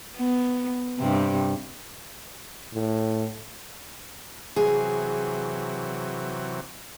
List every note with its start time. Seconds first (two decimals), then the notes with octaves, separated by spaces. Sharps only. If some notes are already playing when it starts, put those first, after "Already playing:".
0.17 B3
0.99 G2 C3
2.74 A2
4.56 C3 E3 F#3 G#4